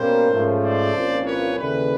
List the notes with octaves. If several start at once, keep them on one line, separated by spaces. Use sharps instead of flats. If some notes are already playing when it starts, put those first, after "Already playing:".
Already playing: B2 G3 A#3 C#4 A#4 C5
G#2 F3 A3 C#4
C5 D5
C2 A#2 F3 A#3 C#4
B4 C#5
D#2 C#3 E3 G3 A4 B4